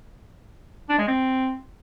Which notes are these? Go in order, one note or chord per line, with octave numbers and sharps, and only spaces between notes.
D4
G#3
C4